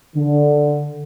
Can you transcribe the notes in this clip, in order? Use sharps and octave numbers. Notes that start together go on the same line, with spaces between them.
D3